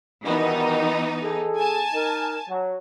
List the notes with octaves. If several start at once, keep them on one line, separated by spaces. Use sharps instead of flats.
G2 B2 D#3 E3 B3 D#4
G#4 A4
G#5 A5
D#4 A#4
F#3